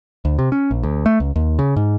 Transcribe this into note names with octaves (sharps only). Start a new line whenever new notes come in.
D2
C3
C#4
A#1
D2
A3
C#2
D#2
C#3
G#2